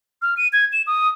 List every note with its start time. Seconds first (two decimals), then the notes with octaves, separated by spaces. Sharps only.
0.22 F6
0.37 D#7
0.53 G#6
0.73 E7
0.87 D#6